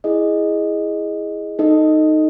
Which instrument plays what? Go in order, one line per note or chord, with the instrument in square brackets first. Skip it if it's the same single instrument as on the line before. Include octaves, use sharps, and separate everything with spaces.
[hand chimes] E4 G#4 D#5
D#4 A4 D#5